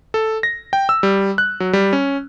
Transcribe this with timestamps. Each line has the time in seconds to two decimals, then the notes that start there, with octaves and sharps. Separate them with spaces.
0.14 A4
0.43 A#6
0.73 G5
0.89 E6
1.03 G3
1.38 F#6
1.60 F#3
1.73 G3
1.93 C#4